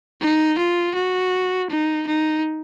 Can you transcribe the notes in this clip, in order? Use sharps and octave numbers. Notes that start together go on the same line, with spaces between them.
D#4
F4
F#4
D#4
D#4